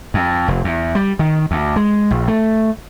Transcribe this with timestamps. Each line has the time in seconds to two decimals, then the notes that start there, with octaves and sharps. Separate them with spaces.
0.14 F2
0.48 F1
0.64 E2
0.95 G3
1.19 D#3
1.51 D2
1.76 G#3
2.11 A#1
2.28 A3